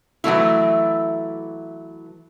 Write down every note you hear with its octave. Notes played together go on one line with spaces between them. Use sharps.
E3 F#3 A3 E4